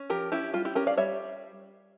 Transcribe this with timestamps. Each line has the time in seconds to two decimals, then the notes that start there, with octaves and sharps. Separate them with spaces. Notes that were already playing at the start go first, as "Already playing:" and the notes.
Already playing: C#4
0.10 F3 G4 A#4
0.32 C#4 E4 G4
0.54 G3 F4
0.65 E4 G4
0.75 C#4 G4 A#4
0.87 D5 F5
0.97 G3 C#5 E5